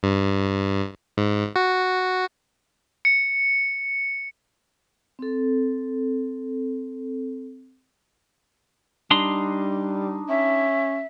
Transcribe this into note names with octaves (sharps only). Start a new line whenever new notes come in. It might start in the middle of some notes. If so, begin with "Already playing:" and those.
G2
G#2
F#4
C#7
C4 A4
G3 D4 D#4 C6
C#4 E5